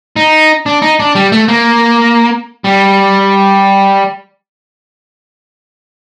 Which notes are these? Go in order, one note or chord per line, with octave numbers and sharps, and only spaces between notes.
D#4
D4
D#4
D4
G3
A3
A#3
G3